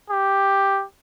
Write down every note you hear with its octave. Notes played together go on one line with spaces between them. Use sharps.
G4